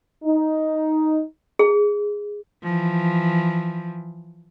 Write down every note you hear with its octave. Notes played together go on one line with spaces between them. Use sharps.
D#4
G#4
E3 F3